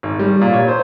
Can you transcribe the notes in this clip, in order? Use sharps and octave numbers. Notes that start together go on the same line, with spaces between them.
G#1
G3
A#2
C#5
C5